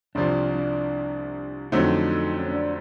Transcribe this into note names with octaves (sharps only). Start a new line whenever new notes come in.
C2 C3 F3 D4
D4
F2 D3 F#3 A3 C4 D#4
C#4
D4